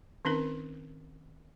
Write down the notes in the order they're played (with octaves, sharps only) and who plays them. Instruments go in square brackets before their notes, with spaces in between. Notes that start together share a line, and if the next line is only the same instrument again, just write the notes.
[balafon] D#3 C4 C#4 D#4 A#4